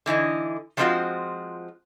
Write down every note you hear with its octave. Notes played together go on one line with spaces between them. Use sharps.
D3 E3 D#4 E4
F3 F#3 G#3 C4 F4 F#4